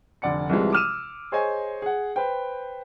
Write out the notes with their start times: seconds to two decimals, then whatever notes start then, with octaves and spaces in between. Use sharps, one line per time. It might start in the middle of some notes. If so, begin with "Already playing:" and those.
0.22 F1 D3 D5 F#5 C#7
0.49 C2 C3 E3 F3 G3 G#3
0.72 D6 E6 F6 D#7 E7
1.32 G#4 C5 C#5 D#5 G#5
1.82 G#4 F#5
2.16 B4 C5 G5